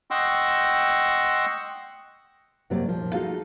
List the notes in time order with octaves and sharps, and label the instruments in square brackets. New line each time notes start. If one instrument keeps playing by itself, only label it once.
[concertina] D#5 F#5 G5 C6 C#6 E6
[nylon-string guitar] F#2 C3 F#3 A#3 G4 D5
D#2 A#2 F3
D#4 F4 F#4 G#4 A4 F5